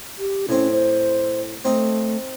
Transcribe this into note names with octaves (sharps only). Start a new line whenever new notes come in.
G4
A2 C4 C#4
C5
A3 C4 D#4